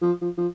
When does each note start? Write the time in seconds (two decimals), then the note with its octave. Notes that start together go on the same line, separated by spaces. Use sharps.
0.02 F3
0.21 F3
0.38 F3